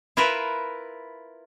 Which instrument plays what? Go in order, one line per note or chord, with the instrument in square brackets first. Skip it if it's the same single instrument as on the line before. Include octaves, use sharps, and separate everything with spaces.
[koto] E4 F4 A#4 B4 E5